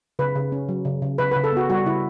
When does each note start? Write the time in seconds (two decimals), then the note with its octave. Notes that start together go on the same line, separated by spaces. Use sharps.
0.19 C#3 B4
0.35 C#3
0.52 C#4
0.69 F#3
0.85 C#3
1.02 C#3
1.18 C#3 B4
1.32 B4
1.36 C#3
1.44 A4
1.53 B3 F#4
1.70 G3 F#4
1.86 C#3 E4